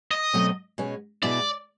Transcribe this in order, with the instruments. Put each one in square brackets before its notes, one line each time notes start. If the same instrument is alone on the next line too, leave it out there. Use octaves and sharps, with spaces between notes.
[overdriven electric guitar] D#5
[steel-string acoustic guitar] B2 F#3 A3 C4
B2 G#3 C#4
[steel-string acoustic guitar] B2 G#3 B3 E4 [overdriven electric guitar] D5